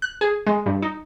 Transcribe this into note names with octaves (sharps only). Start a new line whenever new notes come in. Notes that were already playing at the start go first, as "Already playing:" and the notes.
F#6
G#4
G#3
G2
D#4